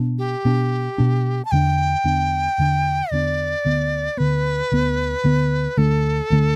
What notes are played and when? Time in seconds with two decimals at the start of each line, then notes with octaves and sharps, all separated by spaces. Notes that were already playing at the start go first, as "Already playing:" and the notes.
Already playing: B2 B3 D4
0.18 G4
0.45 B2 B3 D4
0.98 B2 B3 D4
1.45 A5
1.51 E2 D3 B3 D4 G5
2.04 E2 D3 B3 D4
2.58 E2 D3 B3 D4
3.11 E2 D3 B3 D4 D5
3.65 D2 D3 B3
4.17 D2 D3 B3 B4
4.72 D2 D3 B3
5.24 D2 D3 B3
5.77 D2 D3 A3 D4 A4
6.30 D2 D3 A3 D4